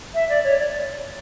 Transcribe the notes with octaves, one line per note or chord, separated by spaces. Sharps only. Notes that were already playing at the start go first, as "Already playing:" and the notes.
E5
D5
C#5
D5